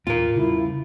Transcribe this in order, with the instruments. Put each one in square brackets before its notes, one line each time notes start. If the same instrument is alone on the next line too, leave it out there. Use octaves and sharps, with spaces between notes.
[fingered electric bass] D#1 A2 A#3 [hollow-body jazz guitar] F4 A#4
[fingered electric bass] C#3 G3 [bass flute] E4